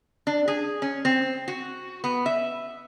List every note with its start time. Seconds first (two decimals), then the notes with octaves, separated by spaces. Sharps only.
0.27 D4
0.48 G#4
0.82 C#4
1.05 C4
1.48 F#4
2.04 B3
2.26 E5